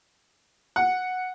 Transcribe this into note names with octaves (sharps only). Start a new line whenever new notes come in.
F#5